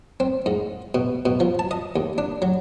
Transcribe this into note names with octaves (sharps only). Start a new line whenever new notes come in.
C4
G#2
B2
B2
F3
A5
D#5
D#2
D4
F#3